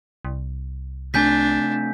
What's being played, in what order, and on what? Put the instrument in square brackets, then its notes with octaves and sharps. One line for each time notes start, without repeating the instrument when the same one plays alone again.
[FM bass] C2
[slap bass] C3 A3 [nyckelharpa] D4 [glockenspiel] G#5 G6 B6